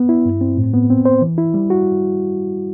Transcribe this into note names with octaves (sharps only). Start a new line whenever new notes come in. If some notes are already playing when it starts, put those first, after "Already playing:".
Already playing: B3
E4
G2
C4
A2
B3
C4
C5
E3
E4
G3
F#4